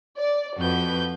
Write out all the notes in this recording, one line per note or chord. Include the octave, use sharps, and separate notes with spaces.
D5
F2 F#4 B4 G6